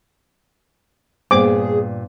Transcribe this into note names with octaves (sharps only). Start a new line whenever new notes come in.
G2 A#2 A#3 B3 G#4 C5 D6